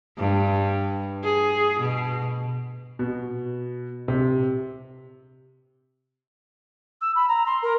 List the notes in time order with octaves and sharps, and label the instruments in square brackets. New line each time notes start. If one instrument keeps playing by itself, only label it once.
[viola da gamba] G2
G#4
B2
[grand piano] B2
C3
[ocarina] E6
B5
A#5
C6
A#4